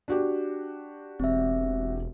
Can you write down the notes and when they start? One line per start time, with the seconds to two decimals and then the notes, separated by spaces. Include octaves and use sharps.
0.08 D4 F#4 G4
1.20 E1 C4 E5